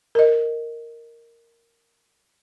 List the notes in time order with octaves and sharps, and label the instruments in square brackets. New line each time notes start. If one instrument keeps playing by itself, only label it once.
[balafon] A#4 D#5